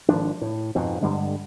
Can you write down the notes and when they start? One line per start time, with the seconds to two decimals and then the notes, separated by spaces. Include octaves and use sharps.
0.09 G#1 F3 D4
0.41 A2
0.75 F2 G#2 B2
1.03 G2 D3 G3 G#3